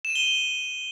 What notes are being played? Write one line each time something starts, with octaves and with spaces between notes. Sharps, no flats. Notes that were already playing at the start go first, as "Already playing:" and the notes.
E7
D#7
G7